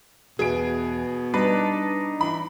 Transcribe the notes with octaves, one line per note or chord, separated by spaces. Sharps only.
E2 B2 G#4 E5 D7
G3 D4 D#4 B4
E3 B5